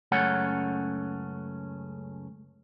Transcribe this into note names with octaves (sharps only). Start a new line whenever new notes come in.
C#2 F#2 A3 C#4 F#5